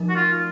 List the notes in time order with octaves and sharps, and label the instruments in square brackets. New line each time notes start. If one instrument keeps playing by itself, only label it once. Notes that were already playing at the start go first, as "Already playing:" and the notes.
Already playing: [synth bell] F3 A3 D#4 A#4
[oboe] F#4
F4